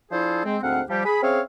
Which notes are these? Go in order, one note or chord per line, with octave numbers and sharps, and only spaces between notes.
F3 D4 E4 G#4 A4 C5
G#3 C4
D2 G#2 C4 F5 F#5
F3 G3 G4
G#4 B5
C4 C#4 G#4 C#5 E5 F5